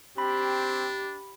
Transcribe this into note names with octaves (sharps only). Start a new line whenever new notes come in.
C4 D4 G4 B5